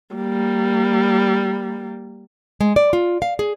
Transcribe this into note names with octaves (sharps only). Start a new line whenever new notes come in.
G3 A#3
G#3
D5
F4
F5
G#4